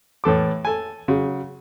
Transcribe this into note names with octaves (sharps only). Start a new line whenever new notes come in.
A2 E3 A4 D6
A4 G#5
C#3 F#3